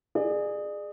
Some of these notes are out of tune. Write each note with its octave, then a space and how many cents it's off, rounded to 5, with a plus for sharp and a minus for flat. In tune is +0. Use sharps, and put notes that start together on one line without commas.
G#4 +0 D5 +35